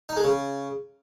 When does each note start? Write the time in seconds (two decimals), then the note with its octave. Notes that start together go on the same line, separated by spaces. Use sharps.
0.09 D#4
0.17 G#3
0.24 C#3